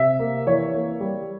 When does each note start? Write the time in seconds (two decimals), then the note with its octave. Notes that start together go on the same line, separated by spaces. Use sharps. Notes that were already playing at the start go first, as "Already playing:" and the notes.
Already playing: C3 E5
0.19 A#3
0.47 E3 C#5
0.74 A#3
1.00 G3